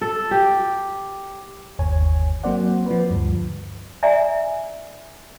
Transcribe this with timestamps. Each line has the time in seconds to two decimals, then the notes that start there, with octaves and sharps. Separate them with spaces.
0.01 A4
0.31 G4
1.79 G1 D#2 C#5 G#5
2.43 F#3 A#3 C4 C5 D5 F#5
2.86 F3 B4
3.11 D2 G2
4.03 D5 E5 G#5 A#5